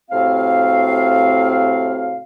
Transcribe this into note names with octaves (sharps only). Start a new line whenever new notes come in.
A2 C3 C4 F#4 F5